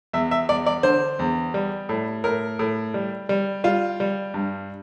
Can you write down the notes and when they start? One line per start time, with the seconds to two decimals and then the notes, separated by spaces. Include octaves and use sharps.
0.13 E2 E5
0.31 E5
0.49 E2 D5
0.66 D5
0.83 D3 C5
1.19 E2
1.54 G3
1.89 A2
2.24 A2 A#4
2.59 A2
2.94 G3
3.29 G3
3.64 G3 F4
4.00 G3
4.34 G2